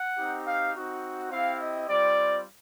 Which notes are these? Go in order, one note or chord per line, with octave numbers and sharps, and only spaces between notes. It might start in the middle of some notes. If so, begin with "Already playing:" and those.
Already playing: F#5
C4 D#4 G4
F5
C4 D#4 F#4
C4 E4 G4 F5
D#5
G3 C4 F4 D5